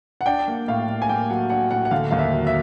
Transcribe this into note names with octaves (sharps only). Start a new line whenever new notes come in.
F#5
D4 G5
A#3
A2 F5
A#3
G#5
A#3 G5
F#3 F#5
D4 F#5
A2 F#5
F#5
D3 F5
D#2 F5
E5
F#3
E5